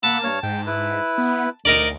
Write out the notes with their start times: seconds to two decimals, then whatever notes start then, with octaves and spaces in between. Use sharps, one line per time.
0.03 A#3 F#5 A5 B5 E6
0.23 G2 C#5 F6
0.43 G#2 G5
0.67 E4 B4
1.18 B3
1.65 D2 D#4 A#4 D5